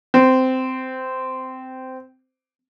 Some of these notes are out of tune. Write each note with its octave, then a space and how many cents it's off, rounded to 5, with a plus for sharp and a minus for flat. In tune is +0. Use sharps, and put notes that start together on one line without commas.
C4 -15